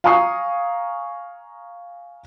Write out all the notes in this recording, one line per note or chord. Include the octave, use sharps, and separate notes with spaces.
F5 G#5 A#5 C#6 D#6 C7